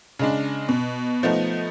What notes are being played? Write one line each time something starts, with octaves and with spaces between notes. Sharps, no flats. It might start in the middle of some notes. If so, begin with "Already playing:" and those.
C#3 G#3 D4
B2
F3 A3 B3 D#4